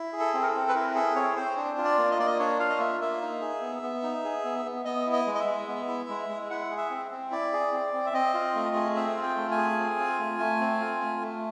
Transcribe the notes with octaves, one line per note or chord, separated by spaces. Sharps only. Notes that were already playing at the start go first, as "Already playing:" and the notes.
Already playing: E4
G#4
A4
C4
A#4
A4
C4
B4
E4 A#4
G#4 A4
C4 C#5
C4 C5
D4
F4
D5
A#3
D#5
A#3 D5
D#5
D4 C#5
F4 F5
D#5
A#3 E5
A#3 E5
D#4
G#4
B3
B3
D#4
G#4
B3
B3
B3 D#5
E4
D#5
G#3
D#5
E5
G#3
B3
E4
G#3
G#3
E4 F#5
G#4
E5
C4
C4
E4 D5
G#4
C4
C4
E5
C4 D#5
F4
A3
G#4
C4 E5
F4
G5
A3
G#5
G#4
C4
F4
A3
A3
C4
F4
A3
A3